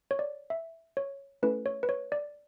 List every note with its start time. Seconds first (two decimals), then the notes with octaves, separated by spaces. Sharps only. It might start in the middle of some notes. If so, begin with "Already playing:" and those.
0.11 C#5
0.19 D5
0.50 E5
0.97 C#5
1.43 A3 C#4 E4 A4 B4
1.66 C#5
1.83 B4
1.89 C#5
2.12 D5